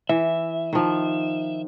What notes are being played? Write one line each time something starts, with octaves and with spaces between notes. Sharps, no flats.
E3 E5
D#3 F3